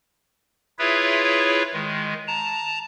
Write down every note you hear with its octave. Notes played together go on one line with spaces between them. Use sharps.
E4 F4 G#4 B4 C#5 E5
D#3 G#3
A5 A#5